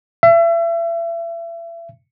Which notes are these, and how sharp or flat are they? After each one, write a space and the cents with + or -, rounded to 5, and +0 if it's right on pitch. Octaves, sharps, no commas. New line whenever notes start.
E5 +35